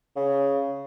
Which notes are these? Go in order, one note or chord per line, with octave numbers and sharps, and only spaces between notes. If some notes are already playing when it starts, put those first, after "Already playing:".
C#3